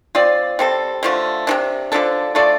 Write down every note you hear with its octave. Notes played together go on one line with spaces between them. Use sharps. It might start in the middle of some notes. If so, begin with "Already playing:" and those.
C4 F4 D5
G3 C4 A4
D3 F3 A3 F4
C3 F3 D4
D3 F3 D4 A4
A3 F4 A4 D5